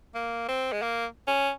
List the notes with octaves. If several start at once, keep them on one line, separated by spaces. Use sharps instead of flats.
A#3
C4
G#3
A#3
C#4